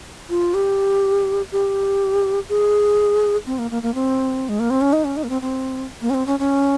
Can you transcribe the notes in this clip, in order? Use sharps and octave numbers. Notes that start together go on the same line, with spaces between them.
F4
G4
G4
G#4
C4
A#3
A#3
A#3
C4
G#3
A#3
C4
C#4
D#4
C#4
D#4
A#3
C4
C4
A#3
C#4
C4
C#4
C#4